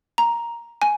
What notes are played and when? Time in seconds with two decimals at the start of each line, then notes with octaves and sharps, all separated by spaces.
0.18 A#5
0.82 G#5